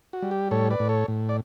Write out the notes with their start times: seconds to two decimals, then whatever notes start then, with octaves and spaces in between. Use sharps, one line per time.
0.13 F#4
0.22 G3
0.31 G4
0.51 A2 A4 C#5
0.71 B4 D5
0.79 A2
0.89 A4 C#5
1.08 A2
1.29 D5